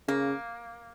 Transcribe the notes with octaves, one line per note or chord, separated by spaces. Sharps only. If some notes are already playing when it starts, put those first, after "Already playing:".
C#3 A#3